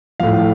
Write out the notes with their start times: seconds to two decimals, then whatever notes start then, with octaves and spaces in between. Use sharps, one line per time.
0.20 A2 F3 F5